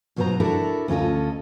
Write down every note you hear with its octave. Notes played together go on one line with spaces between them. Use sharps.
G2 B2 F#3 B3 C5 A#5
D4 E4 F#4 A4 A#4
D2 C#4 F4 A4 D#5